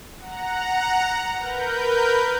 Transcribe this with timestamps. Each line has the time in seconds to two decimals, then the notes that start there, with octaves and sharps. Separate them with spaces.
0.19 F#5 A#5
1.37 A#4 B4 G6